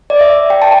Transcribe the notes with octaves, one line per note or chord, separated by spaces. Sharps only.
D5
E5
G5
A5